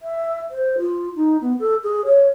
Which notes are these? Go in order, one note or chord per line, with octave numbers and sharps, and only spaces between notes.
E5
C5
F4
D#4
B3
A4
G#4
C#5